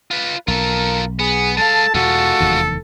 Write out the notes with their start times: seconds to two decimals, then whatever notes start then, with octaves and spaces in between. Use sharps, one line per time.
0.11 F4 B4
0.48 B1 F4 A4 A#4
1.19 B3 G#4
1.57 G#3 A4 F5 A5
1.95 E2 B2 G#3 F4 F#4 A4
2.40 F1 E2 D#3